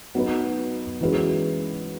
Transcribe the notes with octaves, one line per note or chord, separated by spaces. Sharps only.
F#3 B3 D#4 F#4 B4
E3 G#3 C#4 F#4 B4